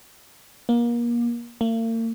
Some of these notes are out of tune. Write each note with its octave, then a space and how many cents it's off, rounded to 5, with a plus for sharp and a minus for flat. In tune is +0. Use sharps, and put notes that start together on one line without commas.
A#3 +30
A#3 -45